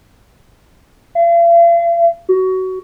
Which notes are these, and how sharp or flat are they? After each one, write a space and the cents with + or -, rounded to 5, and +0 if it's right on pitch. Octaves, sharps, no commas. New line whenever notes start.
F5 -45
F#4 +20